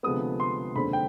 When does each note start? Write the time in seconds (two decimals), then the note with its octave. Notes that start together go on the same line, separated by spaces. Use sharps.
0.03 D2 C3 F3 G#3 B3 D#6
0.40 C6
0.75 F1 D#2 D3 G#3 C4 B5
0.93 G5